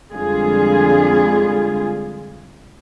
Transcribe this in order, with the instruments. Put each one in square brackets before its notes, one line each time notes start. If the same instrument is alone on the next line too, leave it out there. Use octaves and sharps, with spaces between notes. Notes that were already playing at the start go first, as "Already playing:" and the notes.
[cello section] F2 D3 G3 G#3 F4 G#4